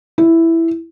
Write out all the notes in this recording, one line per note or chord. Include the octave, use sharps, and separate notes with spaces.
E4